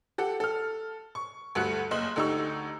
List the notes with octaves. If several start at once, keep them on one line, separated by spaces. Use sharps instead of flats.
G4 A4 F#5
A4 F6
C#6
D2 G2 A3 F#4 F#6 C#7
F#1 D#5 C6 F#7
D2 D3 D#4 G4 C#6 E6